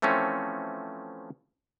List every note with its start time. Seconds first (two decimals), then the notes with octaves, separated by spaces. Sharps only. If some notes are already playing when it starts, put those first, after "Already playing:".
0.02 E3 F3 A3 C4 C#4